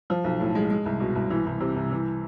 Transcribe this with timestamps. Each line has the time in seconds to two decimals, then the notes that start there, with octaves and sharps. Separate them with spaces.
0.10 F3
0.24 B1
0.40 A2
0.55 G#3
0.70 G#3
0.86 C2
1.00 B2
1.15 C2
1.30 E3
1.46 C2
1.60 C3
1.76 C2
1.91 E3